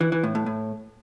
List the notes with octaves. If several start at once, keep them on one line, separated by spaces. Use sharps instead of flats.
E3
E3
A2
A2
A2